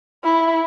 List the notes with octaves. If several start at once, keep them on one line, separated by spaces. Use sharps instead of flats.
E4